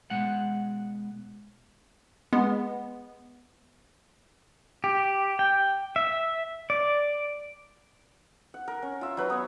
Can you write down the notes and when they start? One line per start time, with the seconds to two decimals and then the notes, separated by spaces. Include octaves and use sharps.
0.10 B2 G#3 F#5
2.33 G#3 B3
4.84 G4
5.39 G5
5.96 E5
6.70 D5
8.54 F#5
8.68 A#4
8.82 C#4
9.01 F4 E5
9.17 F#3 B4 A#5
9.30 B3 C#5